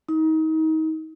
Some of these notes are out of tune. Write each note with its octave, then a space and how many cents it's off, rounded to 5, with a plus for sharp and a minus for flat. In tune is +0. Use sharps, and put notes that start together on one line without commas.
D#4 +30